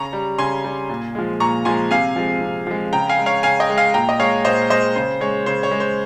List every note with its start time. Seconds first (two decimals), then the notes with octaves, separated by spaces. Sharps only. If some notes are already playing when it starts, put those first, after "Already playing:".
Already playing: C#3 A#5 C#6
0.13 G3
0.38 C#3 G#5 C6
0.64 G3
0.89 A#2
1.15 F3 G#3
1.40 A#2 A#5 C#6
1.65 F3 G#3 G#5 C6
1.91 C3 F5 G#5
2.16 F3 G#3
2.42 C3
2.67 F3 G#3
2.92 C#3 G5 A#5
3.09 F5 G#5
3.18 G#3
3.26 C#5 F5
3.43 C#3 F5 G#5
3.60 D#5 G5
3.69 G#3
3.78 F5 G#5
3.94 A#2 G5 A#5
4.09 D#5
4.19 G#3 C#5 F5
4.45 A#2 C5 D#5
4.70 G#3 C5 D#5
4.96 C#3 C5
5.21 G#3 C#5
5.46 C#3 C5
5.63 C#5
5.71 G#3
5.80 C5